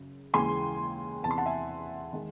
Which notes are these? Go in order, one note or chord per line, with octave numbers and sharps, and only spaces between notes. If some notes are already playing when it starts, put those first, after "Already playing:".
Already playing: F#2 C#3
D#2 C#3 E3 G#3 G#5 C6
E2 C3 E3 A5
C6
F#5 A5
E5 G#5
D#3 G#3 D#4